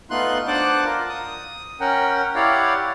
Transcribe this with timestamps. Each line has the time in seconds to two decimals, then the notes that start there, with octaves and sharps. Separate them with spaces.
0.10 A3 B3 D#4 F4 C6 F#6
0.47 D4 C5 D5 F#5 D6 F#6
0.85 F4 A#4
1.09 D#6
1.80 C#4 A#4 F#5 G5
2.35 E4 G4 C#5 D5 F5 F#5